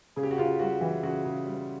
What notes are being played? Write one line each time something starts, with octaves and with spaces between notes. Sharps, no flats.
C#3 G#4
G4
F#4
C#3 F4 G4
G3 F#4
E3
C#3 F#4
C#3
G3